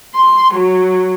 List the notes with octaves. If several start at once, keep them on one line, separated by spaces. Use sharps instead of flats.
C6
F#3